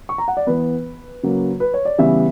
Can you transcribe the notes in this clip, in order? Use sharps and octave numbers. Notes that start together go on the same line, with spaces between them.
C#6
A#5
F#5
D5
E3 B3 B4
C#3 F#3 A#3
B4
C#5
D5
C#3 E3 G3 B3 E5